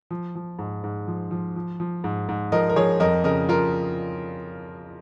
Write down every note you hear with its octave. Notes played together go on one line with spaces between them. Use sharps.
F3
F3
G#2
G#2
F3
F3
F3
F3
G#2
G#2
F3 A#4 D#5
A#4
F3 G#4 C#5
F2 A#4 D#5
C#3 A#4 D#5
F2 F4 A#4